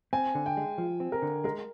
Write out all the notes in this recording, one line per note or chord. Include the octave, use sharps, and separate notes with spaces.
C4 G#5
D3
G5
G#3
F3
C4
A#4
D3
G#3 A#4